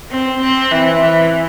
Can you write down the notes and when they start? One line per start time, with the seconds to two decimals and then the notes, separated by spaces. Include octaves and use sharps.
0.11 C4
0.41 C4
0.72 E3
1.02 E3